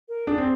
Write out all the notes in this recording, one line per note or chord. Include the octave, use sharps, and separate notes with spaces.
A#4
D4 G#4
C4